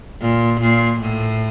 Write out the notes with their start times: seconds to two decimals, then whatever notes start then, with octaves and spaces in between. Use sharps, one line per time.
0.21 A#2
0.61 A#2
1.01 A2